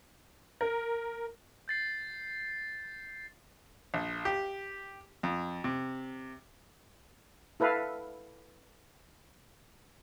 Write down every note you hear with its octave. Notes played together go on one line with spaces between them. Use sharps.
A#4
G6 A6 C7
A#1
G4
F2
C3
E4 A4 B4 F5